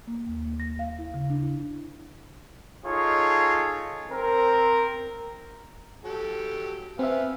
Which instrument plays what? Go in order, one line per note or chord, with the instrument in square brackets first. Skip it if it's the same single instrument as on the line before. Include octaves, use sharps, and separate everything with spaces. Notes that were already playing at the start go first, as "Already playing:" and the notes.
[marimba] A#3
D#2
A#3
A#6
F5
E4
C#3
D4
E4
[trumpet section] D#4 F4 G#4 A4 C#5
C4 A#4
[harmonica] F#3 G4 A4
[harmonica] B3 F5 G#5 [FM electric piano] C4 E5